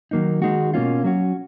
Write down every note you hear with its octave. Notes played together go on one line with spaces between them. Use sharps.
D#3 F#3 A#3 D#4
D#3 G#3 D#4 F#4
B2 A#3 C#4 F4
F#3 C#4 F#4